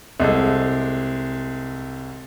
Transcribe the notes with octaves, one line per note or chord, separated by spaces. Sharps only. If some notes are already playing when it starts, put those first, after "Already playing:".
C2 G#3 A4